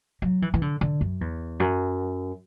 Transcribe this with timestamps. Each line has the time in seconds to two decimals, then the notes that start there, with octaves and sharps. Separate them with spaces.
0.22 F#3
0.42 E3
0.54 E3
0.62 D3
0.81 D3
1.01 F#2
1.21 E2
1.60 F#2